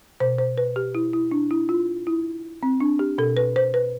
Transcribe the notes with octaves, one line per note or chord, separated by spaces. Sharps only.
B2 C5
C5
B4
G4
E4
E4
D4
E4
F4
E4
C4
D4
G4
B2 A4
B4
C5
B4